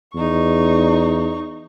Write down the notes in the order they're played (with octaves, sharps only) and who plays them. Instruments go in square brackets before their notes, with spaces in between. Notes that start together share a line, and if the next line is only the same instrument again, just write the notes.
[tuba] E2 [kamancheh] D#4 C#6